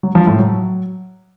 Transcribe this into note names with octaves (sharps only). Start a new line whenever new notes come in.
F#3
F3
A2
F#3